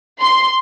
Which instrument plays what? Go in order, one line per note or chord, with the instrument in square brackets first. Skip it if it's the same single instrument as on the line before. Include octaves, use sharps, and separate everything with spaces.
[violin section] C6